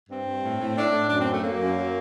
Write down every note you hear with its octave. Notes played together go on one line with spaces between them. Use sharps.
G2 C4
G2
A2
A2
A2 D4
A2
F#2 D4
C4
F#3
A3
F#3 A#3
F#2
F#3